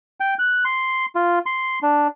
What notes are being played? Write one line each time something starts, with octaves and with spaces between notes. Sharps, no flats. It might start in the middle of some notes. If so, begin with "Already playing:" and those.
G5
F#6
C6
F4
C6
D4